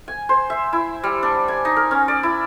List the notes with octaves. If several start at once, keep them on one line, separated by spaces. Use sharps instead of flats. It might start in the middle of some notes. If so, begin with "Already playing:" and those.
G#5
C5
E5
E4
G3
D4
G#5
D#4
A#4
C#4
D5
E4